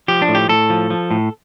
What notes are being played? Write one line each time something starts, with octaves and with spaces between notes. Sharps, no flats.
F3 G4
D4
A2
G4
A2 A4
F3
F3
A2